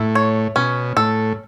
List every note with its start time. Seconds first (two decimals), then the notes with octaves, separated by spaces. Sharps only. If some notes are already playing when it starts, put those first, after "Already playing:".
Already playing: A2 E4
0.15 C#5
0.56 B2 C#4
0.96 A2 A4